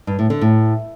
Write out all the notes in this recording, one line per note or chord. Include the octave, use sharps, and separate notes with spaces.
G2
A2
D3
A2